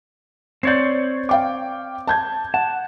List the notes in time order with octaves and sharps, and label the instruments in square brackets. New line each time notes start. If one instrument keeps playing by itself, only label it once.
[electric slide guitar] C4 C#5 D5 [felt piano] G6 C7
[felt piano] F5 G5 D6
A5 G6 G#6
[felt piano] F#5 [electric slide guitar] A5